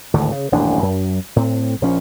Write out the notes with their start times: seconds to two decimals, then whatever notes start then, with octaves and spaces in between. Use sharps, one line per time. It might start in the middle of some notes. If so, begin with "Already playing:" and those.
0.14 G#1 D2 A2 D3
0.31 C#3
0.52 D#1 A1 F#2 D4
0.82 F#2
1.36 A2 C4
1.81 A#1 F3 C#4